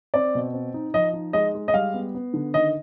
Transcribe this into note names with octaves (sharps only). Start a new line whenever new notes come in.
C4 D5
B2
C4
D#4
F3 D#5
D#4
G#3 D#5
G#3
D#5
G3 F5
B3
B3
D3
D#3 D#5